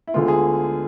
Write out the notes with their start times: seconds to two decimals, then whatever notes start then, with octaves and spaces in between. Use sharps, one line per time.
0.07 E4
0.14 D2 D3 G#3 B3 F4
0.28 G#4